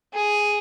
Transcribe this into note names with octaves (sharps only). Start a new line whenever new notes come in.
G#4